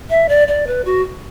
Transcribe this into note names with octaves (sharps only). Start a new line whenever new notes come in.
E5
D5
D5
B4
F#4